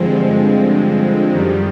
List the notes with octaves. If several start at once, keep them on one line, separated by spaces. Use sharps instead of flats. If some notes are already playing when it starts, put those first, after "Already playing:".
Already playing: G2 D3 F3 G#3 C4
F#2 D#3 G3